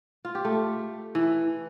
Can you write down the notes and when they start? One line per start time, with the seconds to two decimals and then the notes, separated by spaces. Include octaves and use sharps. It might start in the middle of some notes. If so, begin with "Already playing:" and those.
0.25 F4
0.35 G4
0.45 A3
1.15 E3